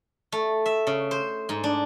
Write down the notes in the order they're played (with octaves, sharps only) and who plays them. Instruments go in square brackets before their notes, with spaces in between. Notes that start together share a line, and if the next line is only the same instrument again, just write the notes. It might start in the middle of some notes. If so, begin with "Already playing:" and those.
[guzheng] A3
E5
C#3
C5
G#2
D4